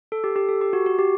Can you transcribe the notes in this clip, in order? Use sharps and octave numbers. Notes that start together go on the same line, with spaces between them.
A4
G4
G4
A4
G4
F#4
F#4
G4